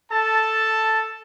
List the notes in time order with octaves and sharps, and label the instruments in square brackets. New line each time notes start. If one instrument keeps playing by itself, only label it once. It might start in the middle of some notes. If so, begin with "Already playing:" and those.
[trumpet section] A4 A5